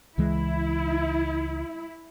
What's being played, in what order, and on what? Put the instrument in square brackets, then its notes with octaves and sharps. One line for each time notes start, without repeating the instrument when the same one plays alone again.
[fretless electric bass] C#2 E3 G#3 [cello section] E4